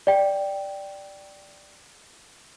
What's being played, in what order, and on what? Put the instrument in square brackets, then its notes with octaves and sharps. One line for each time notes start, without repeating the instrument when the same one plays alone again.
[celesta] D5 G5